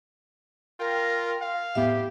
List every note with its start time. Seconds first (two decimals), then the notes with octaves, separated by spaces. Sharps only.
0.80 F4 A#4 G5
1.41 F5
1.75 E2 A2 B3 G4 E5